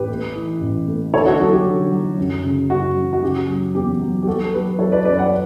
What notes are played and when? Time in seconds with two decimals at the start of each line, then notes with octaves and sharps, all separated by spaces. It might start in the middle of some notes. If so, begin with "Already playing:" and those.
Already playing: A1 G4 B4
0.09 A3
0.35 E3
0.61 A1
0.88 A3
1.13 D3 A4 C#5
1.26 F#4 A4
1.40 F#3 F#4 A4
1.53 G4
1.65 D3
1.92 F#3
2.18 F#2
2.44 C#3
2.70 F#2 F#4
2.96 F#2
3.13 F#4
3.22 C#3 G4
3.48 F#3
3.75 E2 G4
4.00 F#3
4.22 G4
4.26 F#3 F#4 A4
4.44 A4
4.54 F#3 G4 B4
4.79 F#3 A4 C#5
4.92 B4 D5
5.05 F#2 B4 D5
5.18 D5 F#5